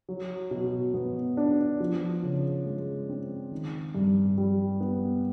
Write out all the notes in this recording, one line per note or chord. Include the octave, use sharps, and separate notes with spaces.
F#3
B2
B3
D4
F3
C#3
G#3
C4
D#3
G2
G3
B3